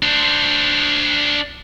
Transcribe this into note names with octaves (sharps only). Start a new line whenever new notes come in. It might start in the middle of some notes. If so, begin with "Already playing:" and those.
D4 C5